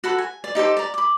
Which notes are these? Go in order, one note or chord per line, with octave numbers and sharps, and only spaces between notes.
F#4 A4 B5
G#5
D5
D#4 G4 A4 C5
D5 A#5
B5 D6